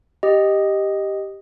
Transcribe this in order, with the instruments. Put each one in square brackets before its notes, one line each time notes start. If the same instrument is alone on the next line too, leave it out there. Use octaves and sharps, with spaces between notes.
[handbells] G4 D#5